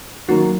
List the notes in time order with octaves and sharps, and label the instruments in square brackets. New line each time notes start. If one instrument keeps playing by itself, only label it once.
[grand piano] D#3 F#3 A#3 [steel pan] F#4